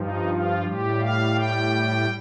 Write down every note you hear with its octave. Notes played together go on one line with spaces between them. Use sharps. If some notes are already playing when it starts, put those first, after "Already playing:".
Already playing: G2 F3 D#4
F4
A2 G3 G4
F5
G5